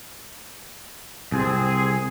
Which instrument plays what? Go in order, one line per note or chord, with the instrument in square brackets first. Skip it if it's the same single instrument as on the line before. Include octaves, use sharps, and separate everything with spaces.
[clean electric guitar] C2 [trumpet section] C4 G#4